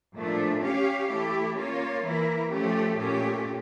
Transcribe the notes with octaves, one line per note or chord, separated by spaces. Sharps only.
A#2 F3 A3 D4
C#4 G4 C#5 F5
E3 A3 E4 G4
A#3 C#4 F4 C#5
E3 A#3 E4 A#4
F3 A3 C#4 G4
A#2 A3 C#4 G4